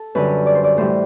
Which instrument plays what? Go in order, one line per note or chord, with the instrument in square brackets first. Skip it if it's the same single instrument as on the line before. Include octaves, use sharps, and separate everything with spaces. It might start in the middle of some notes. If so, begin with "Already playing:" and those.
Already playing: [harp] A4
F#2 D3 G3 B4
D5
C5
D5
A2 E3 G3 C5